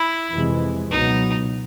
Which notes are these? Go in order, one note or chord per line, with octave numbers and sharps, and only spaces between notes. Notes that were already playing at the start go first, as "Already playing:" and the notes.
Already playing: E4
F2 C3 E3 G#3
C#2 B2 F#3 B3 D#4